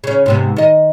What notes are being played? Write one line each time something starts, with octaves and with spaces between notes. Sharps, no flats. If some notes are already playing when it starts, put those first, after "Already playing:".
C#3 C#4
G#2 C3 B3
D#3 D#5